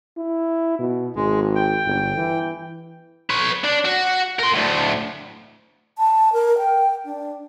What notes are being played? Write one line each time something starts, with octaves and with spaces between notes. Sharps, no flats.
E4
B2
G#1 G#3
G5
G1
E3
B4 C#5
D4
F#4
A#4 C6
D2 A2
A5
A#4
G5
D4